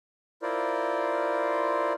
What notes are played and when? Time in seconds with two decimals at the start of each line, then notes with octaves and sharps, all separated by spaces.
0.42 E4 F4 A#4 C5 D5